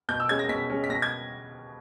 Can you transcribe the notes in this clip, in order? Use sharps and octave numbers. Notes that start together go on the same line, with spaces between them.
B2 G6
E6
G#3 C#4 G#6
A#6
B2 B6
G#3 C#4
B6
B2 A#6
G#6